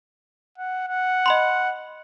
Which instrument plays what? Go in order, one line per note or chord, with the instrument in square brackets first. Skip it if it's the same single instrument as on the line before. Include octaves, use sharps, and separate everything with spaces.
[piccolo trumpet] F#5
F#5
[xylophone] D#5 B5 C6